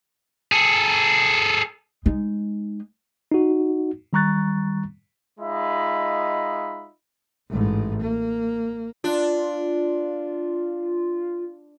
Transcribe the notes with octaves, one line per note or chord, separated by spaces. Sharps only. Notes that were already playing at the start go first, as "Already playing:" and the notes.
G#4 A4
G#3 D#4
D#4 F#4
D#3 G3 A#5 C#6 F#6 A6
G#3 D#4 F4 D#5 E5 B5
A1 G#2
A#3
D4 F4